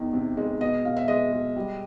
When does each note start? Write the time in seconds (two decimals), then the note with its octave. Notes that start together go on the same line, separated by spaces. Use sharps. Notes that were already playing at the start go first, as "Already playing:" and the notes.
Already playing: E2 D#3
0.13 C3
0.37 G#3
0.61 B2 D#5
0.85 B2 F5
0.97 E5
1.08 G#3 D#5
1.33 G#3
1.56 G3